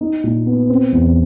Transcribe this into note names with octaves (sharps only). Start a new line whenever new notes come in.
D#4
A#2
B3
C4
E2